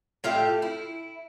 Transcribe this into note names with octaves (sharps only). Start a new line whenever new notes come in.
A2 F4 G4 E5
E4